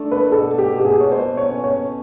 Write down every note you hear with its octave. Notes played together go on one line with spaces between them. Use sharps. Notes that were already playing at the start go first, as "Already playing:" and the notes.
Already playing: A3 D4
B4
B2 A4
G4
B2
G4
G#4
C#5
B2 C5
C#5
C#4
C#5